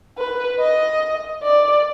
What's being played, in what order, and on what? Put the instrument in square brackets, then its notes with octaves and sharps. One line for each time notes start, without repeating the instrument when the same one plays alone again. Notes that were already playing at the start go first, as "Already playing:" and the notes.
[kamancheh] B4
D#5
D5